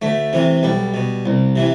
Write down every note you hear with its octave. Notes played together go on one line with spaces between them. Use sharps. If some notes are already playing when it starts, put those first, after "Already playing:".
D2 A3
C3 E3
B1 G3
B2
C2
C3 E3